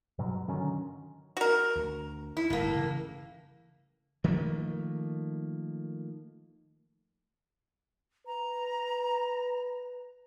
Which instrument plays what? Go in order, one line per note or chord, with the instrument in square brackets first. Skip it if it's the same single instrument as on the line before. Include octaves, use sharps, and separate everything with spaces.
[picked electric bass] G2 B2 F#3
D3 D#3 F#3 C#4
[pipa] F#4 A#4
[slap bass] D2
[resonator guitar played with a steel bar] E4
[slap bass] G1 [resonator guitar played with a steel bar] A2 A#3
[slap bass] C#3 E3
D#3 F3 A3 A#3
[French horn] B4 [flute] A#5